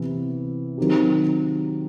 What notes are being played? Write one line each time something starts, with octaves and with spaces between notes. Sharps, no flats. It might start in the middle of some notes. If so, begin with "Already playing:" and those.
Already playing: C3 E3 B3 E4
D#3 F#3 C4 D#4 G4